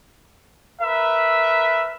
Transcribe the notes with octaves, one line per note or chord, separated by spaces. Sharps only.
A#4 B4 E5